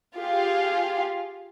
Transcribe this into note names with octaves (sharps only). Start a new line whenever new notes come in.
F4 G4 G#4 F5